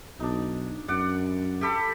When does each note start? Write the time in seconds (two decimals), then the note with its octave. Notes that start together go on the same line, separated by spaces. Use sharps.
0.20 B1 D4 D#4
0.88 F#2 D5 F#5
1.61 G4 A4 B5